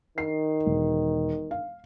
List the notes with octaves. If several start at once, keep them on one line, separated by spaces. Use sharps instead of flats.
D#3 C7
E1
F5